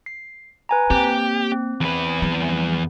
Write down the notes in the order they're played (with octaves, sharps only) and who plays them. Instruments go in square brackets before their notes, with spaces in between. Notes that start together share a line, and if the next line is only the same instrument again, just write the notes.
[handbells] C7
B4 G#5 A#5
[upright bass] A#3 [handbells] C4 [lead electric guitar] G4
[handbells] C4
[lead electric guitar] E2 B4
[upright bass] F3 G3